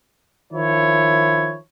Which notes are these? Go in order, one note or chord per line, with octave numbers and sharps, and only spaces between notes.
D#3 F3 E4 C#5